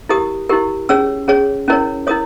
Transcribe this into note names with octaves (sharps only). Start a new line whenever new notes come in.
E4 G4 A#4 D#6
E4 G4 A#4
C#4 G#4 C#5 E6
C#4 G#4 C#5
C#4 E4 A#4 C#5
E4 A#4 C#5 D#6